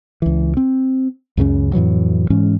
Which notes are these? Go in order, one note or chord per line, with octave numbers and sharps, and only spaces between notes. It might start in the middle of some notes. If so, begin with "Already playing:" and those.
C#2 E3
C4
C#2 F#2 C#3 C#4
F2 A2 E3 F#3
G#2 E3 G#3 C#4